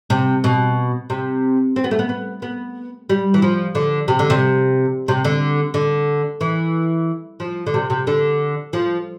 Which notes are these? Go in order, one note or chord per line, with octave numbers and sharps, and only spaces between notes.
C3
B2
C3
C4
B3
A3
B3
B3
B3
G3
E3
F3
D3
C3
D3
C3
C3
D3
D3
E3
F3
D3
C3
C3
D3
F3